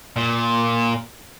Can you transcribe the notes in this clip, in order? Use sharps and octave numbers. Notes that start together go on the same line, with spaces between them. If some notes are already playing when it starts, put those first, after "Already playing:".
A#2